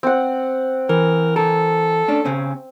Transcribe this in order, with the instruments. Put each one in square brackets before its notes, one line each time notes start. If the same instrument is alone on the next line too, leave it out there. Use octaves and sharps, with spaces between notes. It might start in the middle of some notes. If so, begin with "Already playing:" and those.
[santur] C4 F#5
[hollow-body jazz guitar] E3 [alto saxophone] A#4
[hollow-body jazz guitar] E3 A#4 [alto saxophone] A4
[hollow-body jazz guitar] A3 C#4 D4
C#3 C4 C#4